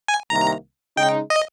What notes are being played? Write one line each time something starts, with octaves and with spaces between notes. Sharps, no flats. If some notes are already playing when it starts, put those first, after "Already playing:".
G#5
C2 C3 D#3 A#3 A#5
C#3 G#3 D#4 G5
D#5